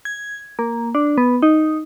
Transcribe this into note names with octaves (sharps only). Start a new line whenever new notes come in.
G#6
A#3
D4
B3
D#4